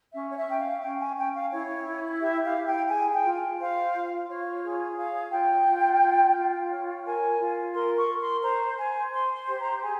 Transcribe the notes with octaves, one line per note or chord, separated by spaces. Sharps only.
C#4 E5
C#5
E5
C#4 G5
F5
C#4 G5
G#5
C#4 G5
F5
E4 C#5
E4
G4 E5
F5
E4
G5
G#4 G#5
G5
F4
C5 F5
F4
F4 C#5
G#4
C#5 F5
F4 G5
F4
F4
F4
C#5
A#4 G#5
F4
A#4 C6
C#6
A#4
C6
C5 A#5
C5 G#5
C5 C6
C6
G4
A#5
G#4 G#5